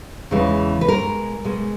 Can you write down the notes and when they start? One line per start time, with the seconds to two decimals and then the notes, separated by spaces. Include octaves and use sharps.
0.31 E2 C#3 E3 G#3
0.81 B4
0.88 B2 G#3 A#4
1.45 B2 G#3